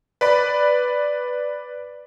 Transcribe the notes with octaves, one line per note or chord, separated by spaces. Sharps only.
B4 D5 B5